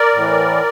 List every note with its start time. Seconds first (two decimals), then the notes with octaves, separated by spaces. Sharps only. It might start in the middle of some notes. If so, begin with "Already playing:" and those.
Already playing: A#4 D5
0.15 A2 E3